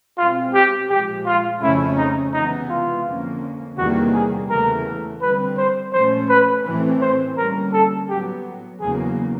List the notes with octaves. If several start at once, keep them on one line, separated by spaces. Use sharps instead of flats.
B2 G#3 C4 F4
G4
A#2 F3 G#3 G4
F4
F2 C#3 F3 A3 C#4 E4
D#4
C3 E3 G#3 B3 D#4
F4
F2 D3 F3 A#3 C#4
E2 C3 D#3 G3 A#3 F#4
G#4
E2 C#3 E3 A3 A#4
D3 G3 C4 B4
C5
A#2 F3 A3 C#4 C5
B4
A2 E3 A3 C4
C5
D3 G3 A#3 C#4 A#4
A4
A2 F#3 B3 G4
E2 C#3 F#3 A#3 G#4